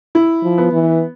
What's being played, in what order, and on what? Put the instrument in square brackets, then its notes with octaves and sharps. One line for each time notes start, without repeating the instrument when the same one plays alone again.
[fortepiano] E4
[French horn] F3
[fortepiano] B3
[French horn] E3